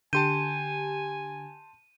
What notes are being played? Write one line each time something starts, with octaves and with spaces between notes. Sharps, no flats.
D3 G4 G#5 A5 C6 G6 D#7